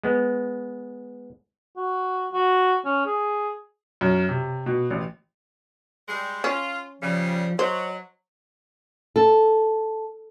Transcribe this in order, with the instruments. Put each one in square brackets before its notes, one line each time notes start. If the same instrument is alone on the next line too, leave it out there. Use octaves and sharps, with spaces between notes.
[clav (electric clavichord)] G#3 B3
[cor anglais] F#4
F#4
C#4
G#4
[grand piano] F#2
C3
B2
A1
[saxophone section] G3 G#3
[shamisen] C#4 [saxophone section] F4
[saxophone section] C#3 G3 [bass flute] F3
[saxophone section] F#3 [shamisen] C5 [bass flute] D#5
[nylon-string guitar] A4